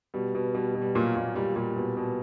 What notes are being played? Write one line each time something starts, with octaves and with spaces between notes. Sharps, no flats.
B2 G3
B2
B2 G3
B2
G3
A#2 F#3 A#3
A#2
A#2 G3
A#2 G3
B2
B2